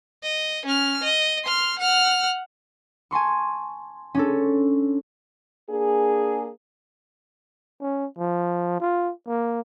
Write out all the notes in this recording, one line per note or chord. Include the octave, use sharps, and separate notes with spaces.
D#5
C#4 F6
D#5
C6 F6
F#5 F6
G#5 A5 C6 C#6
C#4 D4 A4
A#3 D4 G#4
C#4
F3
F4
A#3